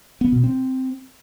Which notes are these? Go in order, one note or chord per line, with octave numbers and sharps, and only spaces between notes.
B3
B2
C4